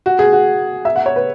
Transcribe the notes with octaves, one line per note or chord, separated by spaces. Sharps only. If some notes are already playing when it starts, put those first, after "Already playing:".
F#4
G#4
F#4
E5
F#5
C#5
B4